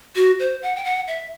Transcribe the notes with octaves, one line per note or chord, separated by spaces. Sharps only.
F#4
C5
F#5
G5
F#5
E5